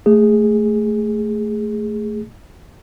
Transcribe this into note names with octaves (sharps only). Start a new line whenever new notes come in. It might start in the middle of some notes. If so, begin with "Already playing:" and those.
A3 G#4